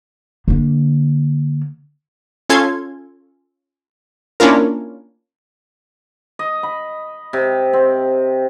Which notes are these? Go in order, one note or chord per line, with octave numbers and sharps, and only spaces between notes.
D3 A#3
C#4 F4 A4 C6 G#6
A#3 C#4 D4 E4 F4 A#4
D#5
B5
C3
C4